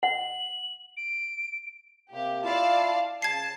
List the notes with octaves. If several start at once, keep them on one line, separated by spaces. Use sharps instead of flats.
F#5 F#7
D7
C3 A#3 G4
E4 F4 D5 F5 A5
C#3 A5 G#6 C7